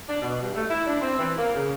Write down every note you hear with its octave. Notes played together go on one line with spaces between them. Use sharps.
D4
B2
G2
A3
E4
D4
C4
E3
A#3
C#3